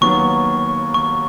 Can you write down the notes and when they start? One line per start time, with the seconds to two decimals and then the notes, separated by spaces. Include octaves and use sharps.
0.01 D#2 D#3 F#3 B3 C#6
0.94 C#6